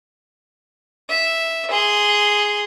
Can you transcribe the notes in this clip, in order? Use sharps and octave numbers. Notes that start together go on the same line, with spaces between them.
E5
G#4 C6